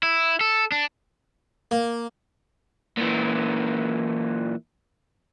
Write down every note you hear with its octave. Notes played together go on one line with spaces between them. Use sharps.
E4
A4
D4
A#3
A#2 E3